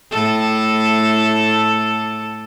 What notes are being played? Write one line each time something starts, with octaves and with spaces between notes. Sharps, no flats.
A2 A4